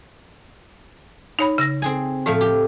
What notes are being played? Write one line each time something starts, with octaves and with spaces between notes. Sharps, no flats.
D#4 C#5 B5
C#3 E6 A#6
C4 G#4 G#5
A2 F3 A3 F5
G4